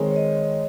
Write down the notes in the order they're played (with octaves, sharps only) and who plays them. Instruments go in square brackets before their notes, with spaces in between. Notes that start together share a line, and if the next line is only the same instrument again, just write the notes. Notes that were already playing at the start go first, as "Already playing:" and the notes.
Already playing: [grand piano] D#3 G#3 C4 [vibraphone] C#5
[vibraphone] C#5
D#5